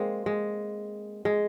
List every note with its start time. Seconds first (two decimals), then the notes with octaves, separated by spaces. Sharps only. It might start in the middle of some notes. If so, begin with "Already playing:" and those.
Already playing: G#3 A#3 C4
0.26 G#3
1.25 G#3